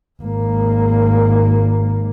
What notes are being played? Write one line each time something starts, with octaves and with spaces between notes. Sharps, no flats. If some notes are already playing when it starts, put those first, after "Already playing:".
G#1 A#3